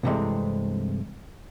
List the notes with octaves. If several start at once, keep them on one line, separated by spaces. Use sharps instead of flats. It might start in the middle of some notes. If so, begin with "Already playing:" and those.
C2 G2 C3 E3 G#3 A3